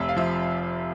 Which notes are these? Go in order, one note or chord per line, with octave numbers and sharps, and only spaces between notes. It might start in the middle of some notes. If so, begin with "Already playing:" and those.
Already playing: F1 C3 E5
F5
F3 E5